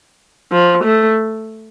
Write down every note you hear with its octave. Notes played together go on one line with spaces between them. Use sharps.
F3
A3